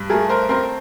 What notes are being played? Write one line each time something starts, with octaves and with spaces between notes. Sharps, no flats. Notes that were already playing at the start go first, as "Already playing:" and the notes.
Already playing: G2
A3 G#4 A#4
A#4 C5
C4 A#4 C5